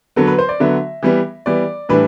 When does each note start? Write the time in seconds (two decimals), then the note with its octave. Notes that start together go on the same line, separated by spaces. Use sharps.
0.16 D3 F#3 B3 A4
0.27 B4
0.39 C5
0.49 D5
0.60 D3 F#3 B3 E5
1.03 E3 G3 B3
1.46 E3 G3 B3 D5
1.89 A2 E3 G3 D4 B4